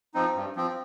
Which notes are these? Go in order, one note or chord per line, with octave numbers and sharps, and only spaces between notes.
F3 C4 D#4
G2
F3 C4